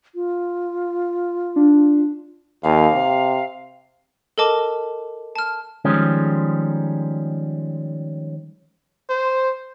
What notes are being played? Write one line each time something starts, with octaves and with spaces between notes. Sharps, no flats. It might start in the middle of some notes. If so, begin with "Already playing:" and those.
F4
D4
D#2 F5
C3
A4 A#4 D#5 A5 D6
A5 F6
D#3 F3 G3 G#3 C#4
C5